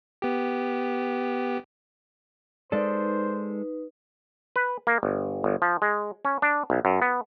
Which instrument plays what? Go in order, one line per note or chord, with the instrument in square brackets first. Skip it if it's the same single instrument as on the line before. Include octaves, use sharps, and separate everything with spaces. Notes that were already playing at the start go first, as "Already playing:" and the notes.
[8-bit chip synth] B3 G4
[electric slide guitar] G#3 A4 [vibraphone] D#4 B4 [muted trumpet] C5 [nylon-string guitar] D5
[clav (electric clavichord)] B4
A#3
G1
G1
F3
G#3
C#4
D4
B1
F#2
B3